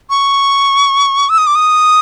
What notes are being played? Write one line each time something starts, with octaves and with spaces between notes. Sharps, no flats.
C#6
E6
D#6
D6
D#6